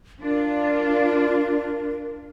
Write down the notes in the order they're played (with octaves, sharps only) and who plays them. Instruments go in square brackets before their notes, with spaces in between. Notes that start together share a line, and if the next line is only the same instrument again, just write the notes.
[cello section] D4 F4 [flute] A#4